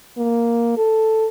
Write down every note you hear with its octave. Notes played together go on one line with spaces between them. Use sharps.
A#3
A4